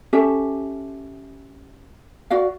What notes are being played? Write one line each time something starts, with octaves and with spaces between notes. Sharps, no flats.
C#4 G4 A4 E5
F#4 D5 F5